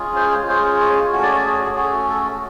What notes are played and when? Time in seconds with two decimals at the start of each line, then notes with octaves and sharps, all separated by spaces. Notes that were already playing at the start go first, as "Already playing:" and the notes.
Already playing: G#3 C#4 F4 G#4
0.16 C5
0.48 G#3 C#4 F4 G#4 C5
0.80 C#5
1.12 A3 C#4 F#4 C#5
1.22 D5
1.32 C#5
1.44 G#4
1.64 G#4
1.76 A3 C#4 F#4 G#4
2.09 A4